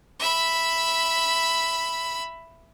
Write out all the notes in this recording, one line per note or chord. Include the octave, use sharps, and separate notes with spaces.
E5 B5